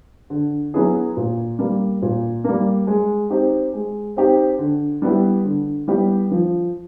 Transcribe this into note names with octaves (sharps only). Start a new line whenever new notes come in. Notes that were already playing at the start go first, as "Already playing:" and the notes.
D3
F#3 B3 E4 G#4
A#2
G3 A#3
A#2
G3 A#3
G#3
C4 D#4 G4
G#3
C4 D#4 G4
D3
G3 B3 E4 G4
D3
G3 B3 E4 G4
F3